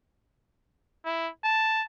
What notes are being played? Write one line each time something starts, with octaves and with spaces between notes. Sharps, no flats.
E4
A5